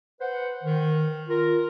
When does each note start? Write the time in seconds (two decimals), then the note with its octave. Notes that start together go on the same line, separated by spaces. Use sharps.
0.20 B4 C5 F#5
0.63 D#3
1.27 F4 A#4